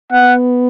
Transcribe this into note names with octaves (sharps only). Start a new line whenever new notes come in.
B3 F#5